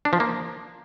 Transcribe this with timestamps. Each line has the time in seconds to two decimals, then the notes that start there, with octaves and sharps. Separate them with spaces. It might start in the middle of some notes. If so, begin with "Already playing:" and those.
0.05 D4
0.13 F3
0.20 A#3